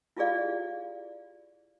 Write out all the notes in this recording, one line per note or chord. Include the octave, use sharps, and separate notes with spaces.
E4 F4 G4 G#4 D5 F5